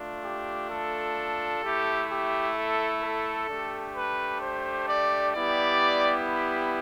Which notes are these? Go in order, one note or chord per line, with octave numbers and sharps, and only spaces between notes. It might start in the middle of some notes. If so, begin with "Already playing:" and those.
Already playing: A3 D4 F4
G4
A4
A3 E4 G4
G4
A4
A4
A3 D4 G4
B4
C5
D5
G3 B3 E4 G4 D5